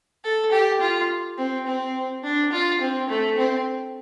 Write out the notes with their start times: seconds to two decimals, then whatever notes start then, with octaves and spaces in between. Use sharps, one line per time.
0.24 A4
0.52 G4
0.81 F4
1.38 C4
1.66 C4
2.23 D4
2.52 F4
2.81 C4
3.09 A3
3.37 C4